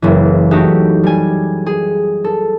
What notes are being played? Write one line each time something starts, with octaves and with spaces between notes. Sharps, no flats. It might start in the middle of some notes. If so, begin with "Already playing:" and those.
F#1 E3
A3 D#4 F#4 G4
G3 G#5
G#4
A4